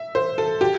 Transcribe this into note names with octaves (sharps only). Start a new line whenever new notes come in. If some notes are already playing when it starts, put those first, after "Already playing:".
Already playing: E5
C5
A4
G4